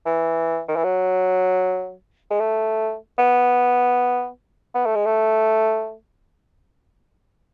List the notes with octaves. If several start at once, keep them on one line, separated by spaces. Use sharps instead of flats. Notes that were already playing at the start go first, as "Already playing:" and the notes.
E3
D#3
E3
F#3
G#3
A3
B3
B3
A3
G#3
A3